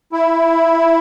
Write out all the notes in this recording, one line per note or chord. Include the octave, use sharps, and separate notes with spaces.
E4